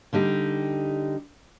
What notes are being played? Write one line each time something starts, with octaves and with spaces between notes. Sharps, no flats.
D3 G3 D#4 G4